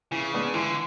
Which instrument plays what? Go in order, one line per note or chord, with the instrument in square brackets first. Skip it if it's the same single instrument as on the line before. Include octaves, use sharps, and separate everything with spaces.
[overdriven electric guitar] C#3 [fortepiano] E3
[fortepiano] G#3 B3 D4
[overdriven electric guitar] D3 [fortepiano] E3